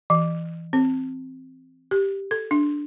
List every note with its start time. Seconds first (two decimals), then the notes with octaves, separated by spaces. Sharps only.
0.10 E3
0.73 C4
1.91 G4
2.31 A4
2.51 D4